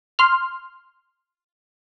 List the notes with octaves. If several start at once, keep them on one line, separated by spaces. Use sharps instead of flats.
C6 F6